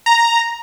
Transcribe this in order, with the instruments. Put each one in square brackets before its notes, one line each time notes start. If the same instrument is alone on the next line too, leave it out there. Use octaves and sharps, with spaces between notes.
[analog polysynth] A#5